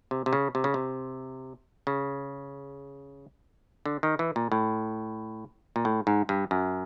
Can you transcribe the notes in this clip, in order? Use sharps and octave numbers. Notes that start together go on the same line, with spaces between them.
C3
C3
C#3
C3
C#3
C3
C#3
D3
D#3
E3
A#2
A2
A#2
A2
G#2
G2
F#2